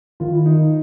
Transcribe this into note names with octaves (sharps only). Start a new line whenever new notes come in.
D#3 F4
E4
D#4